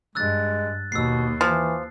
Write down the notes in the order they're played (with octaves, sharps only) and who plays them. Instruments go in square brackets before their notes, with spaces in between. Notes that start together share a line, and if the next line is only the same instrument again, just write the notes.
[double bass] G2 [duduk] G#3 [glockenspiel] E6 F#6 A6
[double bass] D#2 [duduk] B2 [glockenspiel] E6 C7
[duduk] E3 [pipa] F3